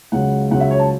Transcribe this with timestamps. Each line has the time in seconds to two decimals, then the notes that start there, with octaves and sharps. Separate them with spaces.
0.12 C#2 C#3 F#3 F#5
0.51 C#2 C#3 F#3 F#5
0.60 E5
0.71 C#5
0.80 A5